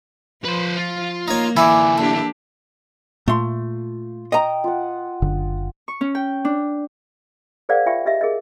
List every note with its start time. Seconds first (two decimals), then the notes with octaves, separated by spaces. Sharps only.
0.44 F3 B4 C5
0.77 F4
1.28 A#3 D#4 C#5
1.57 D3 E3 E4 D5 G#5
1.97 A#3 D4 G4 A4
3.28 A#2 A3 F4 C6
4.32 D#5 G5 A#5 D#6
4.64 F4 F#5
5.22 F#1 D3
5.88 C#6
6.01 C#4
6.15 G5
6.45 D4
7.69 G#4 A#4 C5 D5 F5 F#5
7.86 F4 E5 G5 C#6
8.06 G4 D#5 E5
8.21 G#4 A#4 D#5